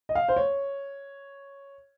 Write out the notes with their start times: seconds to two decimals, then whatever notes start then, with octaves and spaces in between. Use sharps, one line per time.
0.09 D#5
0.15 F5
0.28 C5
0.36 C#5